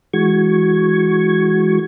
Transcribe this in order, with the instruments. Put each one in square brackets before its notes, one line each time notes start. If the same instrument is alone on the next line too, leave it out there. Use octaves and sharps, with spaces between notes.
[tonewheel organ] E3 G#3 F#4 C#6 G#6